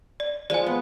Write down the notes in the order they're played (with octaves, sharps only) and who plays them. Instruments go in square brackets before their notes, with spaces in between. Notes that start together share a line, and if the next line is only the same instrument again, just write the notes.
[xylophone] D5
[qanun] F3 G#3 [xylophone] D5 G#5
[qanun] B3